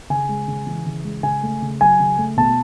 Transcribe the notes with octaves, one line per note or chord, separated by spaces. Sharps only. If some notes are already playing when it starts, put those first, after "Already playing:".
C#3 G#5
G#3
C#3
E3
C#3
G#3
C#3 G#5
A3
C#3
F#3 G#5
C#3
A3
B2 A5